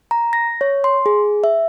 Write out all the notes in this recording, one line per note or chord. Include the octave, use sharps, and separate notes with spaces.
A#5
A#6
C#5
C6
G#4
E5